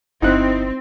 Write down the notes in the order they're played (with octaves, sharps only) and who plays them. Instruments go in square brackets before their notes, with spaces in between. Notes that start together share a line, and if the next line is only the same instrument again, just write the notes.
[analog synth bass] G1 [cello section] C4 [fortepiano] D#4 E4 F#6